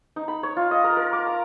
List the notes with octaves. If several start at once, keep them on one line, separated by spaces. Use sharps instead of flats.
D#4
B5
C#5
F4
D#5
A#4
A#4
D6
A#5